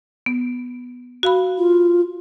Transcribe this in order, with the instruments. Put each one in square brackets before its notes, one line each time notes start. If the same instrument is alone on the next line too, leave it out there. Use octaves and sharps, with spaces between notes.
[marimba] B3
F#4 F5 B5
[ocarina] F4